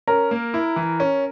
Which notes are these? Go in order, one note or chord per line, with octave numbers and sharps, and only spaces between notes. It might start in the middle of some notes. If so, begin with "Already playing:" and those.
C#4 A#4
A#3
E4
E3
C#4